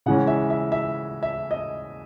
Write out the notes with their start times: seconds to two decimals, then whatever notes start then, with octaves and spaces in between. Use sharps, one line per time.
0.06 C#3 E3 G#3 C#4 F#5
0.27 E5
0.50 E5
0.72 E5
1.23 E5
1.51 D#5